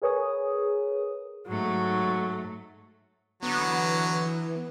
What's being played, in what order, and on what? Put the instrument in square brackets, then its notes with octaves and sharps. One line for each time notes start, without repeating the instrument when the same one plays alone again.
[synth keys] G#4 A#4 B4 C#5 G#5 D#6
[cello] G#2 A3 [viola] F#3
[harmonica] D3 F#3 [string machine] E3 [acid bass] B3